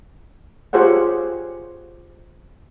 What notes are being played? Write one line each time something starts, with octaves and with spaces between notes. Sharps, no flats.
F4 G4 G#4 C5 C#5 F#5